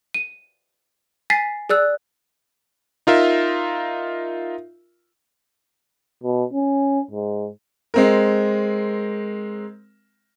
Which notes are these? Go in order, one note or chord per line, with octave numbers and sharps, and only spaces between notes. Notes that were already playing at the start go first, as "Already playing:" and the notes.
D#7
G#5 A6 B6 C7
G#4 D5 E6 F#6
D#4 F4 A#4 E5
B2
C#4
G#2
G#3 C4 A#4